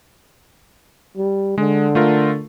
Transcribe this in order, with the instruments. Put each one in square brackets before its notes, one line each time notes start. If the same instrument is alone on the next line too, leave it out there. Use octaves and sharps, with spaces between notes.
[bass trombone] G3
[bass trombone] D3 [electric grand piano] G#3
[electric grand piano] A3 F4 A#4